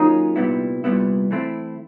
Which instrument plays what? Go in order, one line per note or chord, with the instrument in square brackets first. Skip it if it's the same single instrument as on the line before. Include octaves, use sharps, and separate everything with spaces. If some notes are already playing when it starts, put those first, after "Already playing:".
Already playing: [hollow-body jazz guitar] F#3 A#3 C#4 F4 G#4 [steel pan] D#4
[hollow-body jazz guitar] C2 A#2 G3 B3 E4
C2 A#2 G3 B3 E4
E3 A3 C4 E4